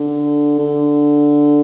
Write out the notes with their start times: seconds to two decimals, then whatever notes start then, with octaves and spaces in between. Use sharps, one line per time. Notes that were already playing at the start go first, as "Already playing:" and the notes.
Already playing: D3
0.59 D3